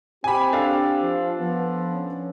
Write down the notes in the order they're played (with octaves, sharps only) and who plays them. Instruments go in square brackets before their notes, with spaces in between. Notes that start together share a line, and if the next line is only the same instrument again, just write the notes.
[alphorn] C4 [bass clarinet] G4 [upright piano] G#5 B5
[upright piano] D4 A4 F5
[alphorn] F3
[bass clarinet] F3 [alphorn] B3
[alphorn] C#4